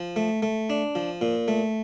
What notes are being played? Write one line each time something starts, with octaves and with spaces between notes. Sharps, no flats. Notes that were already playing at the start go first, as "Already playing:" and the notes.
Already playing: F3
A3
A3
D4
F3
A#2
A3